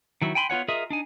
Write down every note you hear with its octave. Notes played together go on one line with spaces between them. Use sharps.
D#3 F#3 E4
G5 G#5 B5 C6
B3 F4 C#5 F#5
F4 G#4 A#4 D#5 E5
D4 D#4 G#5